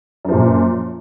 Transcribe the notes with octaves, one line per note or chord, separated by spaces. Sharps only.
F#2 A#2 F3